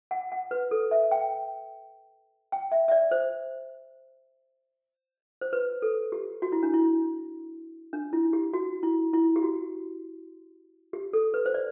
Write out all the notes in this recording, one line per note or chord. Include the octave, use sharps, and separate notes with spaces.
F#5
F#5
B4
A4
E5
G5
G5
E5
E5
D5
C5
C5
B4
A4
G4
F#4
E4
D4
E4
D4
E4
G4
F#4
E4
E4
G4
F#4
G4
A4
B4
C5
D5